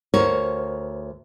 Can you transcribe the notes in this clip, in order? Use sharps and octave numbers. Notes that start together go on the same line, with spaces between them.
D2 A#4 C5 C#5